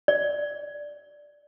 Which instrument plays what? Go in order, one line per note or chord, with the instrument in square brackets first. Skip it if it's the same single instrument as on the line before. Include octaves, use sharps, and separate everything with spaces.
[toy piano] D5